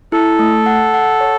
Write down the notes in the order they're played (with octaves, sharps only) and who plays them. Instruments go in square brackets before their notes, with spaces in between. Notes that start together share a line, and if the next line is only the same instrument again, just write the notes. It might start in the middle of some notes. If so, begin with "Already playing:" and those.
[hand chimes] E4 [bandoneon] A4
[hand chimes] A3
F#5
F#5
C#5